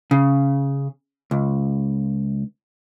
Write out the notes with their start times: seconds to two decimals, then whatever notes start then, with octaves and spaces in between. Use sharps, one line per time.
0.11 C#3
1.31 C#2